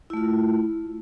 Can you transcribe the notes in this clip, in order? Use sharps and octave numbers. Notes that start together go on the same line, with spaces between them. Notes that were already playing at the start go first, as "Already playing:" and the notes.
A3 E4 F4